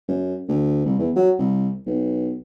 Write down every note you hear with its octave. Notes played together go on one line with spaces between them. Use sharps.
F#2
D2
C2
E2
F#3
C2
B1